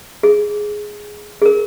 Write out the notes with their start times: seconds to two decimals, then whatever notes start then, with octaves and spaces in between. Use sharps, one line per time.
0.23 G#4
1.42 G#4
1.46 A#4